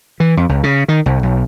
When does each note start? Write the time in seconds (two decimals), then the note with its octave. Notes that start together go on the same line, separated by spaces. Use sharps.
0.20 E3
0.37 F2
0.49 C#2
0.63 C#3
0.88 D#3
1.06 C2
1.23 B1